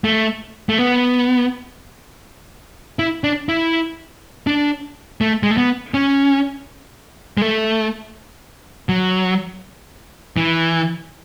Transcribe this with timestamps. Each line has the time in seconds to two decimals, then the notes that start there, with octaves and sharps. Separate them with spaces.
0.04 A3
0.69 A3
0.79 B3
2.99 E4
3.24 D4
3.49 E4
4.47 D4
5.21 A3
5.43 G#3
5.51 A3
5.58 B3
5.94 C#4
7.37 G#3
7.42 A3
8.89 F#3
10.37 E3